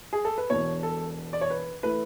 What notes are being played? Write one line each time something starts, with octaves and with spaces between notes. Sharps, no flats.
G#4
A4
B4
E1 E2 B2 C#5
A4
D5
C#5
B4
E3 A3 B4